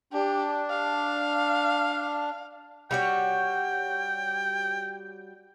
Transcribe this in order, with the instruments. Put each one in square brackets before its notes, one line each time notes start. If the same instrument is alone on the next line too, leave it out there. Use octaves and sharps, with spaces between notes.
[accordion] D4 [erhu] G4
[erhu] F5
[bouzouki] G3 F#4 C#5 [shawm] G5